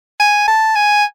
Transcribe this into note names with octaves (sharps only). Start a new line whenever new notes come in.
G#5
A5
G#5